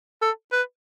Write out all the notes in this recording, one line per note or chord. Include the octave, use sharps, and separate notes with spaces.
A4
B4